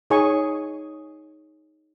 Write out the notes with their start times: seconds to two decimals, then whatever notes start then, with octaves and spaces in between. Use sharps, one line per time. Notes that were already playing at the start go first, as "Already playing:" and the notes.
0.10 D#4 G#4 C#5 G#5 C#6